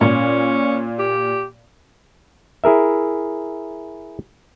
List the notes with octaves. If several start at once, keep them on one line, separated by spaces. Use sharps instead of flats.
A#2 C#4
G4
E4 G#4 A#4 E5